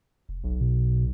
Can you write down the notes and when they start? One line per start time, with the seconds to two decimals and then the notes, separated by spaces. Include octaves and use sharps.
0.29 F1
0.44 B1
0.61 B2